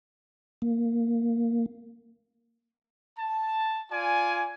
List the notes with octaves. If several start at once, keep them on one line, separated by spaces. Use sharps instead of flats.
A#3
A5
F4 D5 G#5